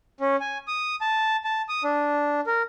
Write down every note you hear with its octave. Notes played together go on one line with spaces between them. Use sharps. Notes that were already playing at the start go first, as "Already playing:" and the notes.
C#4
G#5
D#6
A5
A5
D#6
D4
A#4